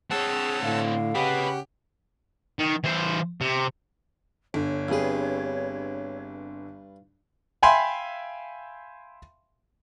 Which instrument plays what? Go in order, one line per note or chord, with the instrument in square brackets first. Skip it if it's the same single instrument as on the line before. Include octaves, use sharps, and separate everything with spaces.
[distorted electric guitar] C4 C#5 [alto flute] G#4 [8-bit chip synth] F#5 A5 E6
[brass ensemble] A2 D3 [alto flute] F5
[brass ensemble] C#3 C#4 F#5 [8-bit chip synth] G4 [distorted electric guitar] B4 D#5
[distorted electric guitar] D#3
E3 C5
C3
[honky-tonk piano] G1 D3 [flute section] C#5
[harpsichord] G2 B4 [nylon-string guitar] C4 G4 G#4
[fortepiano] E5 F5 G5 G#5 B5 C6